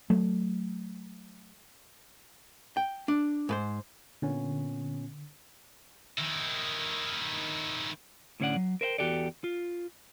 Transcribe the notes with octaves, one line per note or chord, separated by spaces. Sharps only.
F#3 A3
G5
D4
G#2 B4 C5
A#2 D3 B3 C#4
D#3 E4
A2 D3 C#4 C#5 D5 F#5
F#3
A#4 C5 E5 G5
E2 F#4 G4 A4 D5
F4